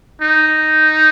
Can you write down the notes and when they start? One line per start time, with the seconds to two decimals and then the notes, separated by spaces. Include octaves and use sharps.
0.22 D#4